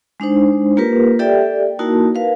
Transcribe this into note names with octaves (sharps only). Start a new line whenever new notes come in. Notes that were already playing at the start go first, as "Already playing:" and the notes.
G#3 D4 D#4 C5
A#3 F4 G4 A#4 B4
G4 A4 D5 E5 G5
A#3 D#4 E4 F#4 A#4 A5
A#4 B4 F5